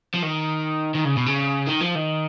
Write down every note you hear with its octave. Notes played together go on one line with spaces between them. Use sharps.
F3
D#3
D#3
C#3
B2
C#3
D#3
F3
D#3